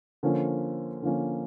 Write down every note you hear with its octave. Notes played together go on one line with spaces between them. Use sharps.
D3 F3 A#3 C#4
D3 F3 A#3 C#4